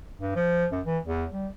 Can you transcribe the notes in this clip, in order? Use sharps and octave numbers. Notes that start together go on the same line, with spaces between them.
G2
F3
F#2
E3
E2
G3